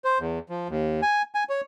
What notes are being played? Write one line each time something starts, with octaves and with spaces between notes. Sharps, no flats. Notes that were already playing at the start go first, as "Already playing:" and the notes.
C5
E2
F3
D#2
G#5
G#5
C#5